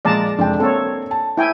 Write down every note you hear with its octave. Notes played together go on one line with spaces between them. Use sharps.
A#2 F3 G#3 D5 A5 A#5
F1 G#3 D4 G5
A#3 C4 A4 C#5
A5
E4 G5 G#5